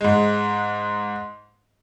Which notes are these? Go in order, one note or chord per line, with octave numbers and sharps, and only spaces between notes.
G#2 G#3